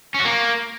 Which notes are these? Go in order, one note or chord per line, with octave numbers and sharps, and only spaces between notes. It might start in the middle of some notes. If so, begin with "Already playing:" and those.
C#4
F#4
A#3